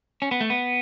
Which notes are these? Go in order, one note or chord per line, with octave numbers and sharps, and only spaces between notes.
C#4
B3
A3
B3